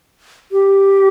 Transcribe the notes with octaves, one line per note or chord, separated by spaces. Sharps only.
G4